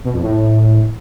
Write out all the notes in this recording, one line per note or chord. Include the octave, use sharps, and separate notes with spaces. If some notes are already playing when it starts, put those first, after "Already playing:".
B2
F2
A2